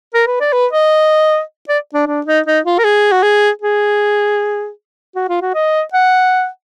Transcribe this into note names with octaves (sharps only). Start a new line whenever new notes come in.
A#4
B4
D5
B4
D#5
D5
D4
D4
D#4
D#4
F4
A#4
G#4
F#4
G#4
G#4
F#4
F4
F#4
D#5
F#5